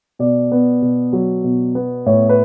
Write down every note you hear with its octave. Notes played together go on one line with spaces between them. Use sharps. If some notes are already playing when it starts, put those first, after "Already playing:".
B2 D5
B3
B2
F#3
B2
B3
A2 C#5
B4